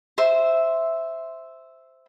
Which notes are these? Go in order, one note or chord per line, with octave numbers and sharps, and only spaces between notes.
C5 E5